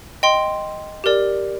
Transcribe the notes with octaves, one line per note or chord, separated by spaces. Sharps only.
D#5 G5 C6
G4 A#4 D5